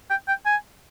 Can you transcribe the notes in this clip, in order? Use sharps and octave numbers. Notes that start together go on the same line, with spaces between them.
G5
G5
G#5